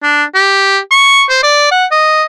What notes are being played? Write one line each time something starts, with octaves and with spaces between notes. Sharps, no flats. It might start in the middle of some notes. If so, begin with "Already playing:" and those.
D4
G4
C#6
C5
D5
F#5
D#5